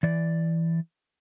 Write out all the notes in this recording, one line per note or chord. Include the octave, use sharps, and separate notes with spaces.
E3 D5